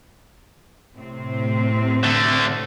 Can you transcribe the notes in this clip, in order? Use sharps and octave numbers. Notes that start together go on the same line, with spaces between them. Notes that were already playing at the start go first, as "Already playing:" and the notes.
A2 C3 C4
D3 A3